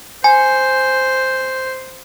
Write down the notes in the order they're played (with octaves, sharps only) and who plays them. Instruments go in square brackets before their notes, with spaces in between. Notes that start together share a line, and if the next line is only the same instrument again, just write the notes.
[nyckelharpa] C5 [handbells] G#5